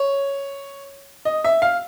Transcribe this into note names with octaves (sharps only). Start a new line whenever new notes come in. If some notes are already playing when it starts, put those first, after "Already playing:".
Already playing: C#5
D#5
E5
F5